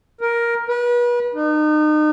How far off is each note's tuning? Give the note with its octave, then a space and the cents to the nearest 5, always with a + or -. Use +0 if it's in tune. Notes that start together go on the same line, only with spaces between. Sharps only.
A#4 +10
B4 -35
D#4 -35